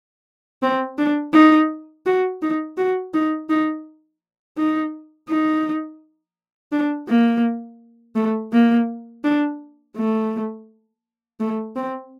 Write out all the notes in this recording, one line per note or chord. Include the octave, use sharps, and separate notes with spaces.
C4
D4
D#4
F#4
D#4
F#4
D#4
D#4
D#4
D#4
D4
A#3
A3
A#3
D4
A3
A3
C4